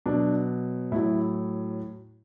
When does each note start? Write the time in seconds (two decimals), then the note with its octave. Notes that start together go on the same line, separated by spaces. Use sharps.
0.06 B2 F#3 D4
0.92 A2 F#3 E4